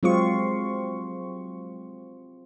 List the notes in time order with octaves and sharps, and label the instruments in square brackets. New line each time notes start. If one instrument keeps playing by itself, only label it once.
[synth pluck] F#3 G#3 C#6 [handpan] C4 F4